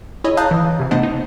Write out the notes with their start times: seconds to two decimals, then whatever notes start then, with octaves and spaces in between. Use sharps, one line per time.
0.24 E4 G#4 C#5 D#5
0.37 F5 A5 A#5 D#6 F#6 G6
0.51 E3
0.79 C3 E3
0.91 A3 B3 D4 C5 D#5
1.03 D#4